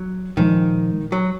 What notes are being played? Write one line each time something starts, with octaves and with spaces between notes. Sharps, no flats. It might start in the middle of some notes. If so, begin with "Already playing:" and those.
Already playing: F#3
A#2 D#3 F3 G#3
F#3